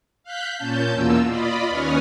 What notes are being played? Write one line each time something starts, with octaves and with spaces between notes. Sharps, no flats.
F5 F#6 G6 B6
A#2 C#4 A5 G6
E2 B2 A#3 F4 E6
F4 D5 D#5 B5
D#2 C#4 B4 C#5 D#6 F6